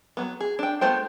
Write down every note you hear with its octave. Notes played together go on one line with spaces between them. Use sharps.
F#3 B3
G#4
D4 G5
A3 B3 F4 C5 G5